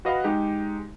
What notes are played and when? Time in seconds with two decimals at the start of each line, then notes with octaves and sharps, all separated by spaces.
0.05 F#4 B4 D#5 F5
0.24 G#3 D#4 G4